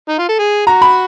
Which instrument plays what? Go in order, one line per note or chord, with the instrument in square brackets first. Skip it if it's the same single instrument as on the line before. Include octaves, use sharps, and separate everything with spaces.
[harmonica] D#4
F4
A4
G#4
[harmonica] F#4 [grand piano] A#5
[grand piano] B5